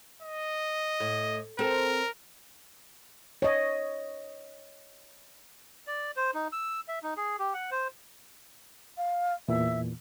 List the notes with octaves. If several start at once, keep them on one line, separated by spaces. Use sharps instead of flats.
D#5
A2
C4 A4 A#4
C#5 D#5
D5
C5
D#4
E6
E5
D#4
G#4
G4
F#5
C5
F5
E2 A#2 E3 E5